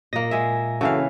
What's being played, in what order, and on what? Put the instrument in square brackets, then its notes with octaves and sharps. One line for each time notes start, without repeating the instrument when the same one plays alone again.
[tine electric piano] A#2 A#6 [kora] A#3 D#5
[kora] G#3 G#4 E5
[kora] C#3 E3 F5 [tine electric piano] F#4 A4